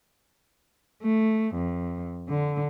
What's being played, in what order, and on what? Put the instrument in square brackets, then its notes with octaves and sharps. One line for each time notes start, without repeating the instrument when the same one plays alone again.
[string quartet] A3
F2
D3